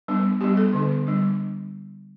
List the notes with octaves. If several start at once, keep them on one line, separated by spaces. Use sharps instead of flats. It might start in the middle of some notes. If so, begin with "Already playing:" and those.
G3 B3 D4
G3 B3 D4 G4
A4
D3 B3 D4
G3 D4